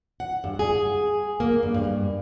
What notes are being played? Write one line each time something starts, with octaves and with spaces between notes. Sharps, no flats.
F#5
G2
G#4
A#3
G2
G2